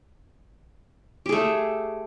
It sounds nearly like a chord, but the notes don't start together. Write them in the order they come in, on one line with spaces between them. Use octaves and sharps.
G4 G#4 A3